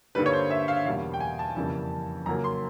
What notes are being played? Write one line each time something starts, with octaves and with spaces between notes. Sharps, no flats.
G2 D3 G3 A#3 B4
C#5
C5
E5
F5
E2 B2 G3 A#3 F5
G5
G#5
A5
F2 C#3 E3 G3 A#3
F#2 C#3 F#3 A#3 A#5
C6